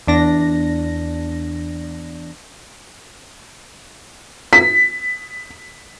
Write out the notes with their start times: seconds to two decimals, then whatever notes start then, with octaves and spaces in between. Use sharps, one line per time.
0.07 E2 D4 A#6
4.53 B6